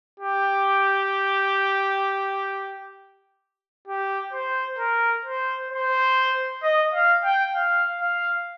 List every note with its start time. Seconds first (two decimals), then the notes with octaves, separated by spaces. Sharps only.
0.20 G4
3.88 G4
4.33 C5
4.79 A#4
5.25 C5
5.71 C5
6.63 D#5
6.94 F5
7.25 G5
7.55 F5
8.01 F5